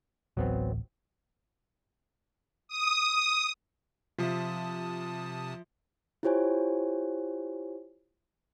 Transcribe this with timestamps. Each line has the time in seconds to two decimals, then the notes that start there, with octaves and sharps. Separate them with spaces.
0.37 D1 A1 F#3 B3 C4
2.68 D#6
4.18 C3 F3 F4 E5 A5 D#6
6.23 E4 F4 G4 C5 C#5 G#5